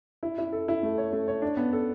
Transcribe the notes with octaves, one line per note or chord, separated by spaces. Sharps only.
E4
E4
A4
E4
A3
C#5
A3
C#5
D4
B3
A4